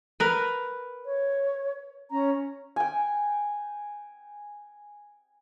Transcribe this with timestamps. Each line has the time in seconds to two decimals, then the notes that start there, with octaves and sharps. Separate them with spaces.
0.20 A#4 B4
1.05 C#5
2.11 C#4 A#5
2.76 G5 G#5